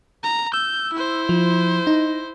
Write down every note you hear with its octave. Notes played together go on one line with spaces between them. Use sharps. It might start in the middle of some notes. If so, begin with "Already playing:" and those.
A#5
E6 G6
E4 C5
F3
D#4